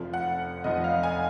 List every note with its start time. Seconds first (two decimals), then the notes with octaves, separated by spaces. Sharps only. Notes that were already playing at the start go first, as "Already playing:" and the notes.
Already playing: F1 F2 F3
0.14 F#5
0.64 F1 F2 F3 D#5
0.84 F5
1.03 G#5